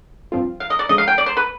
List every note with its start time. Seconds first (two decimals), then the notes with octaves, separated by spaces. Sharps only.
0.32 G2 F3 C4 F4
0.60 F5
0.70 D#5
0.79 D5
0.89 D2 D3 F3 G#3 D#5
0.98 F5
1.08 G5
1.18 D5
1.26 C5
1.37 B4